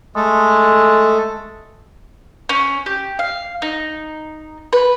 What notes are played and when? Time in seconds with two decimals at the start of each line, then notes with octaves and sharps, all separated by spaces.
0.16 G#3 A3 A4
2.49 C#4
2.86 G4
3.19 F5
3.62 D#4
4.73 B4